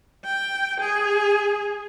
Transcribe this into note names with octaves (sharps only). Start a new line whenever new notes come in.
G5
G#4